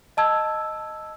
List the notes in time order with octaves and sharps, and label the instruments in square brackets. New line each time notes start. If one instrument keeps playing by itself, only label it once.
[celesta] D#5 A5 E6 G#6